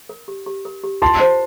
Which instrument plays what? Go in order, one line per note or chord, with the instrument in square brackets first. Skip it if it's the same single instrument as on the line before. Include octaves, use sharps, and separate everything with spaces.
[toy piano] A#4
G4
G4
A#4
G4
[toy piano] F4 [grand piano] A5 C6
[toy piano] C5